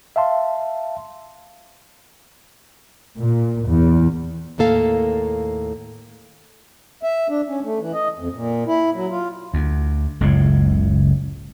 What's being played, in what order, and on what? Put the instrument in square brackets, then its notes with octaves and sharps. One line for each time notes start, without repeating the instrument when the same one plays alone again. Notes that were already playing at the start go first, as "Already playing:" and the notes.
[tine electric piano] E5 F5 A5 C6
[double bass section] A#2
E2
[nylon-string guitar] D#2 A2 A#3 A4 F5
[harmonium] E5
D4
C#4
A3
E3
D#5
F2
A#2
E4
F#3
F4
[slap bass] D2
F#1 C#2 A2 C#3